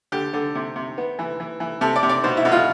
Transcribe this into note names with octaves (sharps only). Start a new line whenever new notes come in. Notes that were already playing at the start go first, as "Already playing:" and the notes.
D3 G4
D3
C3
C3
B3
E3
E3
E3
C3 A4
D5
C3
D5
B2 C5
E4
B2
F4